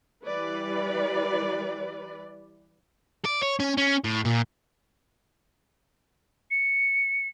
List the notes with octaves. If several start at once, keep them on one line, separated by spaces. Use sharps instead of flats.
E3 G3 B4 D5
D5
C#5
C#4
C#4
A2
A#2
C#7